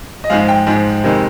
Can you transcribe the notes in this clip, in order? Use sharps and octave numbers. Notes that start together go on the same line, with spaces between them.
D#5
G#2 F3 G#3 F5
G5
G#2 F3 G#3
F2 C3 D#3 G#3